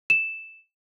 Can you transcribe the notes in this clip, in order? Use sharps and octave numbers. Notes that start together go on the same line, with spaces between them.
E7